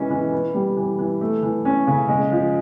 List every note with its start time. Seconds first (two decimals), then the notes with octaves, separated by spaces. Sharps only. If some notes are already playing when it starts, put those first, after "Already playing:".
Already playing: E3 G#3 C#4
0.10 E3
0.32 B3
0.54 G3
0.77 E3
0.99 E3
1.21 A3
1.43 E3
1.65 C#4
1.87 C#3
2.08 G#3
2.31 F3